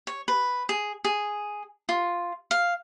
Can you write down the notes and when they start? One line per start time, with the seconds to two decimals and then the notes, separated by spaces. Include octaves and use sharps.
0.07 C#5
0.28 B4
0.69 G#4
1.05 G#4
1.89 F4
2.51 F5